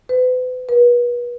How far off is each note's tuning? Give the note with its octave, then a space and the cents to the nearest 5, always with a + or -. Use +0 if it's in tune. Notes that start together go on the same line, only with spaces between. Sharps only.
B4 +40
B4 -35